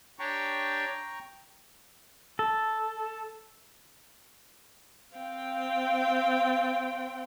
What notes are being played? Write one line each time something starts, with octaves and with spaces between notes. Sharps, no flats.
D4 G4 C#5 G5 A#5 C#6
A4
C4 F5 G5